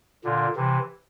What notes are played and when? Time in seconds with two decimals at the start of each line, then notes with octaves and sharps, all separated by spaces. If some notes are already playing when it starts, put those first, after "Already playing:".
0.24 A#2 D3
0.55 C3 E3